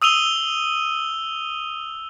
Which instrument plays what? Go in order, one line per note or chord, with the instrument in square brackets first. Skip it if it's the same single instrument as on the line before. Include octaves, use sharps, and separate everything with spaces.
[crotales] D#6 E6 D#7 F7 G7